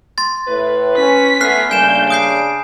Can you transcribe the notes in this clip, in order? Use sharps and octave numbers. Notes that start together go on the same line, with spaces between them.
C6 A6
A2 B4
C#4 B6
A3 B3 G#5 F6 F#6 C7
C#3 G3 A3 A#3 D4 G#5 G6 E7
D#6 G6 C7 D7